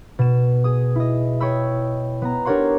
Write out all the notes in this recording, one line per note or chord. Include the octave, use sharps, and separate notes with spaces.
B2 E7
G#4 D#6
E4 D#5
C#5 D#5 G5 B5 E6
B3 A#5
D4 G4 A#4 C#5 F#5 C6